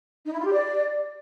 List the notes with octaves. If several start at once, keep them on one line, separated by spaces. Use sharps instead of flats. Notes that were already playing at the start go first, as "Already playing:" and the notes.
D#4
E4
F4
G4
D5